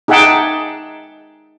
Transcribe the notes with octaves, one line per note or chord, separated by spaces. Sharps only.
D#4 G#4 E5 F#5 G5 A5